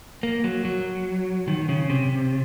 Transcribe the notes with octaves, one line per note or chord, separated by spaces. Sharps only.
A#3
F#3
F#3
D#3
C#3
C3